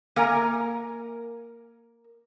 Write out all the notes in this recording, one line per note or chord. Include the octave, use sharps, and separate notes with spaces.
A#3 A#4 G#5 A#5